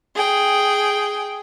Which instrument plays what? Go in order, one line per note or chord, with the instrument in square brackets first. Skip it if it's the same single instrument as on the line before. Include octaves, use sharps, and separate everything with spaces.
[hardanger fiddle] G#4 G5